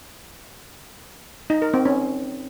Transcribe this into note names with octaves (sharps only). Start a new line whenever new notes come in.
D#4
A#4
C4
C#4